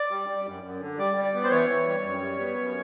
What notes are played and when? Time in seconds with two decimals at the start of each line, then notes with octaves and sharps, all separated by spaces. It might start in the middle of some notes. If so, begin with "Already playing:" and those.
Already playing: D5
0.11 G3
0.29 G3
0.47 F#2
0.63 F#2
0.81 D3
0.99 G3 D5
1.16 G3
1.25 D5
1.34 B3
1.44 C5
1.51 E3 C#5
1.69 E3
1.87 G3
2.04 F#2
2.21 G3
2.39 B3
2.56 F#2